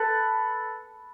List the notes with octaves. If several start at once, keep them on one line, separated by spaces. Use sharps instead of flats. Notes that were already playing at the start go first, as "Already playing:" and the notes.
Already playing: A4 B4